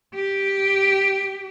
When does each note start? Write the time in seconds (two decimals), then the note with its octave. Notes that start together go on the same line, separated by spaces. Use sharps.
0.14 G4